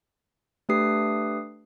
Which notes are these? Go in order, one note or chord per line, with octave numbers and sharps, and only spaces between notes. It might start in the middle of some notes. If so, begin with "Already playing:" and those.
A3 D4 G4 B4 D#6 C7